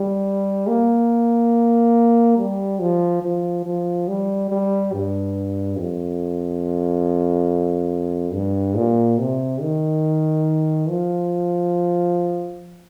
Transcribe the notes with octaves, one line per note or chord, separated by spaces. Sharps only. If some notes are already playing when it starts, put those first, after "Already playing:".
Already playing: G3
A#3
G3
F3
F3
F3
G3
G3
G2
F2
G2
A#2
C3
D#3
F3